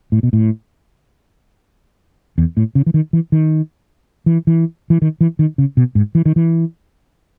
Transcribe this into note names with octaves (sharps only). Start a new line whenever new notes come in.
A2
B2
A2
E2
A2
C#3
E3
D#3
E3
D#3
E3
E3
E3
D#3
E3
D#3
C#3
B2
G#2
E3
D#3
E3